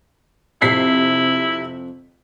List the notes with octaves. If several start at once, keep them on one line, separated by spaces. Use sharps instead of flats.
F2 C3 E4 B6 C7